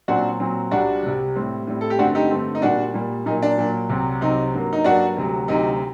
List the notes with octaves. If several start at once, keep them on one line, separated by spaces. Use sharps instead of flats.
A#2 F#3 C4 D4 F#4
A#2 F#3 C4
C2 C3 G3 D4 F#4
C2 C3 G3
A2 G3 C4
A2 G3 C4
A4
G4
G2 D3 A3 C4 D4 F#4
D#4 G4
G2 D3 A3 C4
D#4
A#2 G3 A#3 D4 F#4
A#2 G3 A#3
A#2 F#3 A#3 D#4
D4
A#2 F#3 A#3
C2 C3 F#3 C4
C2 C3 F#3 C4 D#4
G2 F#3 A#3
D#4
G2 F#3 A#3 D4 F#4
D2 C3 F#3
D2 C3 F#3 D#4